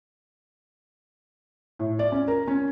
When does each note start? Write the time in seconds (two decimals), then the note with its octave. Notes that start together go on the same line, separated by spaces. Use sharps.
1.79 A2
1.99 D5
2.12 C#4
2.28 A#4
2.48 C#4